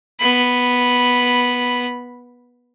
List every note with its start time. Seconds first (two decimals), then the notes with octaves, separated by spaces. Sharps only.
0.20 B3 B5